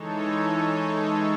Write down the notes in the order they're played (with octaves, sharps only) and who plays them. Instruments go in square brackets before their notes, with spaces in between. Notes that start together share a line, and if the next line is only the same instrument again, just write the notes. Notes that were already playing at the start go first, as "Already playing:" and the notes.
Already playing: [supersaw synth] E3 G#3 D#4 A4 C#5